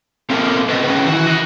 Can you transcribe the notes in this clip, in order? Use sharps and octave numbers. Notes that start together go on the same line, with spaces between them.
C#3 F3 C4 A4 A#4
A2 C#3 B4 D#5
C#4 B4
D#3 E3 F#4
D#5 F#5